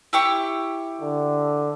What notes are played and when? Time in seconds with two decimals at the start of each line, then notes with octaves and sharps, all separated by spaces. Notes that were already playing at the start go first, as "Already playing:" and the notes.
0.13 E4 G4 C#6
1.01 D3